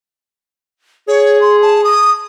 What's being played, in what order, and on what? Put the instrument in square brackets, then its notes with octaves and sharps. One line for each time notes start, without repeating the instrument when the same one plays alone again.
[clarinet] G#4 [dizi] C#5
[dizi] C6
A5
D#6